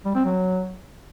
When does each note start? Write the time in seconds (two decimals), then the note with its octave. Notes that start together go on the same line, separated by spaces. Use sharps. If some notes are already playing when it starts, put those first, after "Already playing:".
0.05 G3
0.15 C4
0.25 F#3